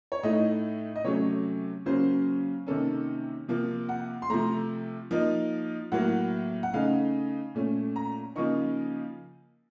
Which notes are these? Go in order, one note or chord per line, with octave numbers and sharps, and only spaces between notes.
C#5
A2 A3 D#4 D#5
D#5
C3 F#3 A3 C#4 C#5
C#3 F#3 A#3 C#4 C5
C3 D#3 A#3 C#4 A4
C3 F3 A#3
F#5
C6
C3 F3 A3 A#5
F3 A#3 D#4
A2 F#3 A#3 F#5
F#5
C#3 A3 D#4 F5
A#2 A3 C#4
A#5
C#3 F3 A#3 D#4 C#6